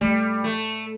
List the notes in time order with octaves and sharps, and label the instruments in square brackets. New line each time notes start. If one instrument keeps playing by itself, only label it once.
[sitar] G3 [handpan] A3
[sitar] A3